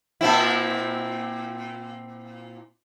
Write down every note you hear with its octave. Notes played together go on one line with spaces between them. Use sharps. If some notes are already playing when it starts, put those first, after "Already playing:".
A#2 C4 E4